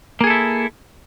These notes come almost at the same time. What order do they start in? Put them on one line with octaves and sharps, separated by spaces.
A#3 G#4 A4 E4